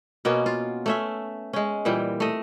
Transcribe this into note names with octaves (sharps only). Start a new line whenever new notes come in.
B2 A#3 B3 C#4
F4
A3 C#4 E5
G#3 C#4
A#2 E3 G3 C4
A3 D#5